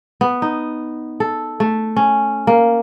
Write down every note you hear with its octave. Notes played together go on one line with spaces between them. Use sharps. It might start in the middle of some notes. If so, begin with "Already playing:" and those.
B3
D#4
A4
A3
C#4
A#3